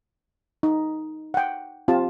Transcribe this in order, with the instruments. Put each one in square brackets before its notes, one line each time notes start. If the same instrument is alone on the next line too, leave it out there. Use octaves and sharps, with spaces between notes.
[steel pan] D#4
F#5 G5
C4 F4 G4 A5